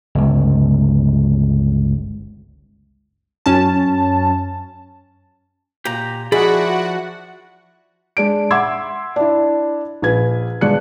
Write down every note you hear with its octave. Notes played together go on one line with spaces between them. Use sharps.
G1 C#2
F#2 C#4 A5
A#2 G4 A#5
F3 E4 F#4 G#4 D5 F#5 B5
G#3 D4 D7
E5 F#5 C6 D6 E6 G#6
D4 E4
A#1 B4 G#6
G1 G#3 D4 F#6 C#7